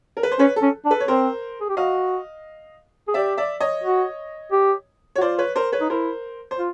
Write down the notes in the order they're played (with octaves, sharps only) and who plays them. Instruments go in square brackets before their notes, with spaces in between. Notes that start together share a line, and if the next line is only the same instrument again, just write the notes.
[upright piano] A#4
B4
C5
[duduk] C#4 [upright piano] B4 C#5
[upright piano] A4
[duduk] C#4
D4
[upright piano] A4 B4
C#5
[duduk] C4 [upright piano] A#4 C5
[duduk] G#4
G4
[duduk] F#4 [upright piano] D#5 F5
[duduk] G#4
[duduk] G4 [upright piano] D5 E5
[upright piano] D5 E5
C#5 D#5
[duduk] F#4
G4
[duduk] F#4 [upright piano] C#5
[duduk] F4 [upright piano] C5 D5
[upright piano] B4 C#5
A#4 C5
B4 C#5
[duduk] D#4
[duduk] E4 [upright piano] A#4 C5
[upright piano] C5
[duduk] F4